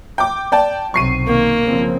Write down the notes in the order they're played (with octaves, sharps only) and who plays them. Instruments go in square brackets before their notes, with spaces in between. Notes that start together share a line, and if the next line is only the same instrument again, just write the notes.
[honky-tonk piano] G5 D6
D5 G5 A5
[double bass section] B1 C3 F#3 [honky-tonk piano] C#6 C7 D#7
[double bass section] D#3 [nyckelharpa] A#3
[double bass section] C#3 F3 C4